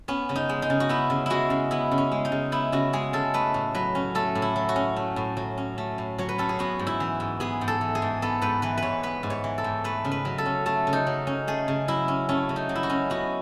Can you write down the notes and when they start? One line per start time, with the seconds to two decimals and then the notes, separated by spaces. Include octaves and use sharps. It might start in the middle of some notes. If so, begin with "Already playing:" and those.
0.08 B3 C#4
0.29 C#3
0.36 D#4
0.49 G#3
0.62 D#4
0.70 C#3
0.80 F#4
0.89 B3 E4
1.10 C#3
1.26 G#3 E4 F#4
1.50 C#3
1.71 B3 E4
1.92 C#3
1.98 C#4
2.12 G#3
2.25 D#4
2.32 C#3
2.52 B3 E4
2.72 C#3 F#4
2.93 G#3 G#4
3.13 C#3 A4
3.34 A3 B4
3.54 A2
3.75 F#3 B4
3.95 C#4
4.15 A3 A4
4.35 A2
4.42 E4
4.56 F#3
4.69 F#4
4.76 C#4
4.96 A3
5.16 A2
5.37 F#3
5.58 C#4
5.78 A3
5.98 A2
6.18 F#3 C#5
6.29 B4
6.38 C#4 A4
6.49 G#4
6.59 B3 F#4
6.79 G#2
6.87 E4
7.00 E3
7.20 G#2
7.40 B3 G#4
7.61 G#2
7.68 A4
7.81 E3
7.95 G#4
8.02 G#2
8.22 B3 A4
8.42 G#2 B4
8.62 E3 B4
8.78 G#2 B4 C#5
9.03 B3 B4
9.23 G#2
9.30 C#5
9.44 E3
9.58 A4
9.64 G#2
9.84 A3 B4
10.05 C#3
10.11 B4
10.25 F#3
10.38 A4
10.46 C#4
10.66 A3 A4
10.87 C#3
10.93 D#4
11.07 F#3
11.27 C#4
11.47 A3 G#4
11.68 C#3
11.88 F#3 E4
12.08 C#4
12.29 A3 C#4
12.49 C#3
12.56 D#4
12.69 F#3
12.76 E4
12.83 F#4
12.90 C#4
13.10 B3 F#4